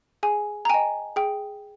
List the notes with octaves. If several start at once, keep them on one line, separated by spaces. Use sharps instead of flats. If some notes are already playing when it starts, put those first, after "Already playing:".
G#4 G#5
A#5
D#5 G5 G#5
G#4 G5